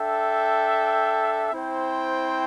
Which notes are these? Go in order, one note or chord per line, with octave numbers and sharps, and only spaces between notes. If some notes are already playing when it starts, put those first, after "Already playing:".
Already playing: D4 A4 E5 G5
C4 E4 C5 G5